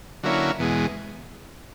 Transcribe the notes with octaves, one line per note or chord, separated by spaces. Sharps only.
D3 F#3 A#3 C#4 E4
E2 B2 G#3